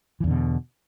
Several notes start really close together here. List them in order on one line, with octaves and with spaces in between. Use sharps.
E3 E2 D3 B2